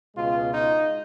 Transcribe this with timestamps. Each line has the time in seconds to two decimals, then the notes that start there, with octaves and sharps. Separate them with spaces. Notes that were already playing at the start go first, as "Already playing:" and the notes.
0.16 C#2 B2 G#3 F4
0.53 D#4